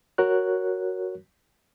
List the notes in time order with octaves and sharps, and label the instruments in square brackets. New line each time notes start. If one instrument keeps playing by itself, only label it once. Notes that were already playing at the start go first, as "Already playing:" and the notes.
[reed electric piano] F#4 A#4 C#5 F#6